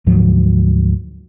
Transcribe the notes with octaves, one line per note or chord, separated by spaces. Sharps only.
D2 G#2 F3 F#3